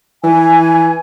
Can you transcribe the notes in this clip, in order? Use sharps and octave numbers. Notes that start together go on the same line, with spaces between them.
E3 G#5